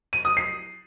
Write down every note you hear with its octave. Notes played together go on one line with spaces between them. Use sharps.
D#7
D#6
C7